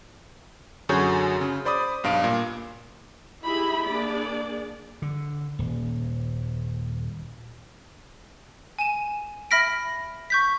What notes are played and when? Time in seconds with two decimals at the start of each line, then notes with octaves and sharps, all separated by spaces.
0.89 F#2 D3 F#4 G#4 C#5 G6
1.41 C#3
1.65 C5 D5 B5 D6 D#6
2.04 B1 G2 F5 D7
2.24 A#2
3.44 D#4 E4 G4 G#4 E5 B5
3.86 A#3 D4 G#4 D5
5.02 D3
5.59 D#1
8.79 G#5 D#7 E7
9.51 E5 B5 F6 A#6 B6 D7
10.30 C#6 G6 B6